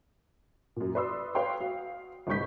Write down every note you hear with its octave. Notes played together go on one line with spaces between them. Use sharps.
F#2 A#2
B4 D5 B5 C6 D#6 E6
B4 C#5 F5 G5 C6
F#4 F5
G1 C2 G#2 C#6 G6 B6